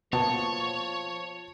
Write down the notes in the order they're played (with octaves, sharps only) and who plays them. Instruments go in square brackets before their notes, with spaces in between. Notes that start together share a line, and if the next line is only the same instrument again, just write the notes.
[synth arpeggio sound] B2 A#3 B3 [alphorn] F3 [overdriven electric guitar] C#5 [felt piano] A5